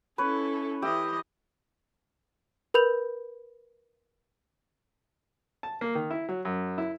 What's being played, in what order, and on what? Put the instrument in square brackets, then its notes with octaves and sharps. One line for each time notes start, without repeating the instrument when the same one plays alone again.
[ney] C#4 [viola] E4 A4 [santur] B4 C#5
[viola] E3 D#5 [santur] G4 E5
[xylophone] A#4 B4 B5 G6 F7
[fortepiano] A5
A#3
D#3
E4
F#3
F#2
E4